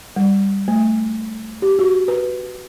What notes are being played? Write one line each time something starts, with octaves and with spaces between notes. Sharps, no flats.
G3
A3
G4
F#4
B4